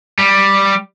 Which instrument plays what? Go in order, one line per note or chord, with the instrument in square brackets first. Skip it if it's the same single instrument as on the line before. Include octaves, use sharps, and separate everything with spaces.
[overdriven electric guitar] G3